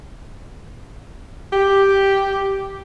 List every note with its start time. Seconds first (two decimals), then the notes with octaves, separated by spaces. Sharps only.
1.53 G4